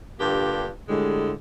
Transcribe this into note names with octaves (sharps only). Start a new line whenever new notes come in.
G2 D3 A#3 F4 G4
A2 D3 G3 G#3